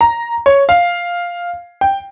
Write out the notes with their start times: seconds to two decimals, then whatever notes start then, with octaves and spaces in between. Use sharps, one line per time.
0.01 A#5
0.46 C#5
0.69 F5
1.81 G5